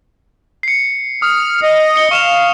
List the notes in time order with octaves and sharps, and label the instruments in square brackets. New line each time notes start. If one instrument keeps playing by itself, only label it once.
[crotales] C7 C#7
[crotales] D#6 [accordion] F6
[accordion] D#5
[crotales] C#7 G7
[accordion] F5 [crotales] C#6 E7 F7